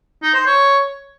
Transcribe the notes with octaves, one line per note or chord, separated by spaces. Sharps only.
D#4
C5
C#5